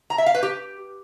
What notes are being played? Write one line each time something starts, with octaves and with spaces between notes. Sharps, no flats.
A#5
E5
F5
B4
G4